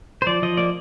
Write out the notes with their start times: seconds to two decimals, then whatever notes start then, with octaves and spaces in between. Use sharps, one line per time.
0.22 C5
0.27 F3 D5
0.42 F3 D#5
0.57 A#3 D5